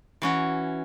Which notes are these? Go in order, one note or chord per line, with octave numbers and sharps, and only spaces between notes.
E3 C#4 F#4